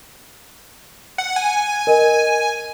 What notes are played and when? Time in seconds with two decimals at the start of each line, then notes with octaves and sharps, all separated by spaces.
1.18 F#5
1.36 G#5
1.87 A#4 D#5